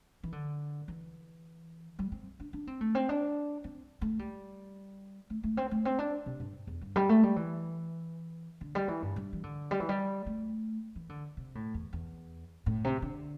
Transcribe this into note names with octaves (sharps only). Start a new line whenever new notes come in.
E3
D3
E3
G3
C4
D4
D4
C4
A3
C4
D4
C4
A3
G3
A3
A3
C4
A3
C4
D4
C3
G2
E2
G2
G3
A3
G3
E3
D3
G3
E3
G2
G2
E3
D3
G3
E3
G3
A3
E3
D3
C3
A2
E2
E2
A2
C3
D3